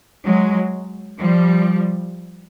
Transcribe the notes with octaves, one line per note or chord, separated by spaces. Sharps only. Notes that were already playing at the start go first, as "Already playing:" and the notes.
F#3 G#3
F3 G3